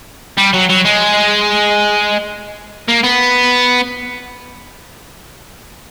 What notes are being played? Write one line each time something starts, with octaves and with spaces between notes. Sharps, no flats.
G3
F#3
F#3
G#3
A#3
B3